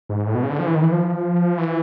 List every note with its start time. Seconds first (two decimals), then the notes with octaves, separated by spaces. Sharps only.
0.09 G#2
0.27 A2
0.35 B2
0.43 C#3
0.50 D3
0.59 F3
0.67 E3
0.75 D#3
0.83 E3
0.92 F3
1.58 E3